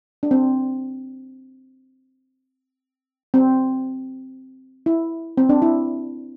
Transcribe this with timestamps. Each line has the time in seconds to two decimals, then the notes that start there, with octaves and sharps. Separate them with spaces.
0.23 D4
0.31 C4
3.34 C4
4.86 E4
5.37 C4
5.49 D4
5.62 E4